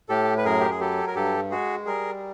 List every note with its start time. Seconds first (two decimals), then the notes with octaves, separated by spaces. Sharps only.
0.09 A2 G4 A4
0.38 B4
0.45 F#2 G#4 A#4
0.60 G4
0.71 G#4
0.80 F#3 G4 A4
1.07 A#4
1.15 G2 G4 A4
1.50 G#3 F#4 G#4
1.86 G3 G#4 A#4